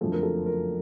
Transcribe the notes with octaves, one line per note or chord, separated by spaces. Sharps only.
F#1 F2 D3 F3 A3 A4
A#4
A4
A#4